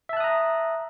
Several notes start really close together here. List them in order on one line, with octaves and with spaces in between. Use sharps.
E5 A5 F#6 D#6 A#5